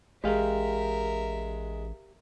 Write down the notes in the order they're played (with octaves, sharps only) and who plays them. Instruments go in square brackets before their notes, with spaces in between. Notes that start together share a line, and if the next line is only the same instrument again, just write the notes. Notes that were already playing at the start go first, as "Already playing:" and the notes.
[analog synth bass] A1 [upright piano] G#3 [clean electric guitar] G4 F5 [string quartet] A#4 E5